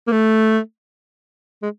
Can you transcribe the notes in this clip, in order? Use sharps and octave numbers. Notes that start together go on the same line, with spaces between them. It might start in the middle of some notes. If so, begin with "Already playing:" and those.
A#3
A3
G#3